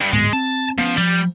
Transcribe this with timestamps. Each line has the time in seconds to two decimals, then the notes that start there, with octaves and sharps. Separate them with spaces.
0.01 G2
0.13 D1 G#2 G#3 B3
0.33 C4 A5
0.79 F3 B3 C#4
0.97 F3 G3